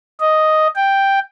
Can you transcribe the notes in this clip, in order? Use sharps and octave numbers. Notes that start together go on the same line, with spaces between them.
D#5
G5